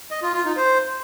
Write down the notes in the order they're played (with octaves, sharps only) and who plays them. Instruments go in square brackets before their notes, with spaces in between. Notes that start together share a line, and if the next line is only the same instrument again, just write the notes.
[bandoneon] D#5
F4
F4
D#4
C5